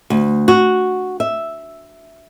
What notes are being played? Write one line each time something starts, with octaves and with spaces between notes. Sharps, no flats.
D2
F#4
E5